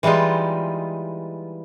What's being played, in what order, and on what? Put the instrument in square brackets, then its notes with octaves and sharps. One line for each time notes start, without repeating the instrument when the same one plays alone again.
[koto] E3 G3 G#3 D#4 F4